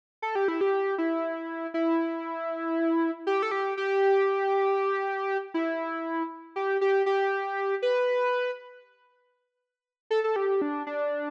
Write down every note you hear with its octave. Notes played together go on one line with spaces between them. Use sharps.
A4
G4
E4
G4
E4
E4
G4
A4
G4
G4
E4
G4
G4
G4
B4
A4
A4
G4
D4
D4